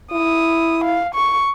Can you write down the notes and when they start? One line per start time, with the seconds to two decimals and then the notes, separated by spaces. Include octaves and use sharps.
0.12 E4 D#6
0.84 F5
1.15 C#6